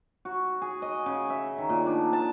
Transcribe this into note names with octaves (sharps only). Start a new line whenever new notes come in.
F#4
G#4
D#5
C#3
E5
D#3
A#2
D4
A5